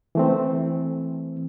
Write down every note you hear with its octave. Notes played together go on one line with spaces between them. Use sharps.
E3 A3 C4